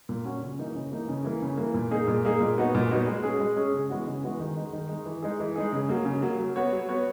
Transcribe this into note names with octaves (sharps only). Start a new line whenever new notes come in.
A#2
F#3 C#4 F#4
C#3
E3 A#3 D#4
C#3
E3 A#3 D#4
C#3
E3 A#3
C#3
E3 A#3
A#2
A#3 D#4 G#4
A#2
A#3 D#4 G#4
A#2
F#3 B3 D#4 F#4
A#2
F#3 B3 D#4 F#4
G#3
C#4 G#4
G#3
C#4 G#4
C#3
E3 G#3 B3 F#4
C#3
E3 G#3 B3 F#4
D#3
G#3 D#4
D#3
G#3 D#4
E3
G#3 D#4 G#4
E3
G#3 D#4 G#4
C#3
F#3 A#3
C#3
F#3 A#3
F#3
B3 F#4 C#5
F#3
B3 F#4 C#5